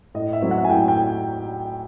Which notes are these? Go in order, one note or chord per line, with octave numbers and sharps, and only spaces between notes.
A2 D#5
E5
F#3 A3 C4 E4
F#5
G#5
A2 G5
G5